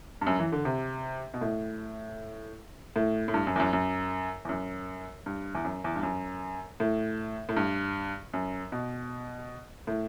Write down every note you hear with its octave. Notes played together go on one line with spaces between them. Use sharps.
G2
F#2
E3
D3
C3
B2
A2
A2
A2
G2
F#2
E2
F#2
F#2
E2
F#2
G2
E2
F#2
E2
G2
F#2
A2
A2
G2
F#2
B2
A2